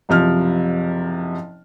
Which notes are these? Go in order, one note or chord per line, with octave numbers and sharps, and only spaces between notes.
F#1 C3 F3 F6